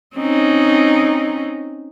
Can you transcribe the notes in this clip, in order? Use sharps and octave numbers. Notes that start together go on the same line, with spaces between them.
C4 C#4 D#4